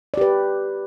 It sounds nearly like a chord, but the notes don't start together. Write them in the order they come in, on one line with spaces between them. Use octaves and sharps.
D5 G4 B4